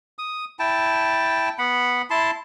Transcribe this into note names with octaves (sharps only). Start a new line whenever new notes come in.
D#6
E4 G5 A5
B3 F#5 B5
E4 A5 C6